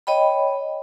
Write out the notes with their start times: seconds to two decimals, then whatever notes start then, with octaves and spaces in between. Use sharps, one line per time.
0.07 C#5 D#5 G5 B5